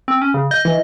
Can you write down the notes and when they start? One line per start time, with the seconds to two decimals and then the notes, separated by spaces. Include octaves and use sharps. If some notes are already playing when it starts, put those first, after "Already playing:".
0.08 C4
0.22 C#4
0.34 C#3
0.51 D#5 G6
0.65 E3